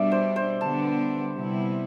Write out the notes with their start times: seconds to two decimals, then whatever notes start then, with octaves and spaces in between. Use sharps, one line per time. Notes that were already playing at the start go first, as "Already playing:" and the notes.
Already playing: B2 G3 D4 D5 E5
0.12 C5
0.36 C5
0.61 D3 G3 B3 D4 A5
1.34 C3 G3 B3 E4